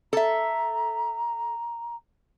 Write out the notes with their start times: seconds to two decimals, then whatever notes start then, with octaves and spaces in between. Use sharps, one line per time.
0.13 A4 E5 A#5